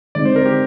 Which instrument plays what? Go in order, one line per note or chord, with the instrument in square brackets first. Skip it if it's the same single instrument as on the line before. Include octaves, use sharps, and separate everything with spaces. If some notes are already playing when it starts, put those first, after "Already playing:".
[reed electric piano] D3 G#3 C4 D#4 [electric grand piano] D5
[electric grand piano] C5
A#4
G4